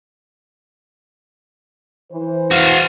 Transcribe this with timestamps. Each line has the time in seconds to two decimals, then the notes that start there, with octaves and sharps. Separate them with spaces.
2.12 E3 C5
2.51 F#4 F5